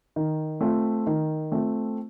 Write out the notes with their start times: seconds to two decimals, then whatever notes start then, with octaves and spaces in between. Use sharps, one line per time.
0.16 D#3
0.61 A3 C4 F4
1.07 D#3
1.52 A3 C4 F4